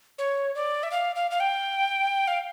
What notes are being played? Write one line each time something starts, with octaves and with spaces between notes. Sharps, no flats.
C#5
D5
E5
F5
F5
F5
G5
F5